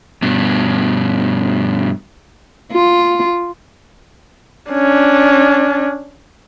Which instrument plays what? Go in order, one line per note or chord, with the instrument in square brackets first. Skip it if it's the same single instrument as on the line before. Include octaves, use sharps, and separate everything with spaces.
[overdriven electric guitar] G2 B2
[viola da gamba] F4
[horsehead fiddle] C#4 D4